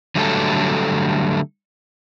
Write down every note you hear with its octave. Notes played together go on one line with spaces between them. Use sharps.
D3 F#3 G3 A3 G#4 A4